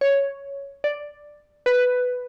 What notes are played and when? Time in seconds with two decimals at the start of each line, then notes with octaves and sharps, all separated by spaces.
0.01 C#5
0.84 D5
1.66 B4